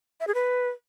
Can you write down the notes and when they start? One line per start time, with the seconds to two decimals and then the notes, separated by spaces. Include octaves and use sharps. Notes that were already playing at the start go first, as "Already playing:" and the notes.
0.20 E5
0.27 G#4
0.34 B4